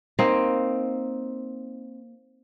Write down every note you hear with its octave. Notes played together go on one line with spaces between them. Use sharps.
A#3 C4 D#4